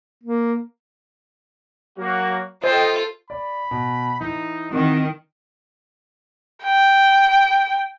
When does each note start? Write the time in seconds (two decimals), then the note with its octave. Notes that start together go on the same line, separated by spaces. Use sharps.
0.23 A#3
1.98 F#3 A#3 F#4
2.64 F4 A4 C5 D#5 G5
3.30 D5 B5
3.71 B2
4.21 E3 D#4 E4
4.72 D#3 C4 F#4
6.65 G5